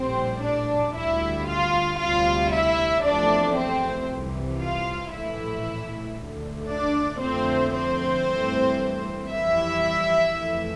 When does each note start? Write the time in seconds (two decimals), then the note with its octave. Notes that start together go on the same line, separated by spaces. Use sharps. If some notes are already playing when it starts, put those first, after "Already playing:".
Already playing: A#1 A2 G3 C4 C5
0.42 D4 D5
0.94 D2 D3 G3 E4 E5
1.46 F4 F5
1.98 D2 C3 G3 F4 F5
2.51 E4 E5
3.03 E2 C3 F3 A3 D4 D5
3.55 C4 C5
4.07 C2 C3 E3
4.60 F4 F5
5.12 A#1 A2 E3 A3 E4 E5
6.16 D2 D3 A3
6.69 D4 D5
7.21 F2 D3 F3 A3 C4 C5
7.74 C4 C5
8.26 G2 E3 A3
9.31 F2 E3 G3 E4 E5
10.35 F2 E3 A3